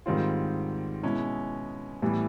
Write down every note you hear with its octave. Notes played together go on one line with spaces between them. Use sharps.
G#2 D#3 G3 C4 F4
B2 G#3 C#4 E4
A2 E3 G3 B3